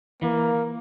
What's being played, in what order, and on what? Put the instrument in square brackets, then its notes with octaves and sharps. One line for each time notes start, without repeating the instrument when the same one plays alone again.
[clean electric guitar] E3 [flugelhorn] A#3